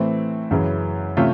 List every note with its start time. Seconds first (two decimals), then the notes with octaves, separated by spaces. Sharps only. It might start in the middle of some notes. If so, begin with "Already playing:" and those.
Already playing: A2 E3 A3 C4
0.51 F#2 C#3 E3
1.17 C3 F3 A3 C#4 F4